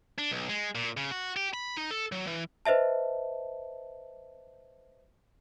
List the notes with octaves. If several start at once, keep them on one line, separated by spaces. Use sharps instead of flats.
D4
B1
G#3
A#2
C#3
F#4
G4
B5
D#4
A4
F#3
E3
B4 C5 D#5 E5 A5